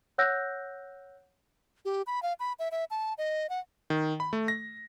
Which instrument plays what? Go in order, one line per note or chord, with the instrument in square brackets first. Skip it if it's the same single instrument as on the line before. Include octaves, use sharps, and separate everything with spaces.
[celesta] C#5 F#5 E6 F#6 G6 A#6
[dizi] G4
B5
F5
B5
E5
E5
A5
D#5
F#5
[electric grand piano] D#3
B5
A3
A#6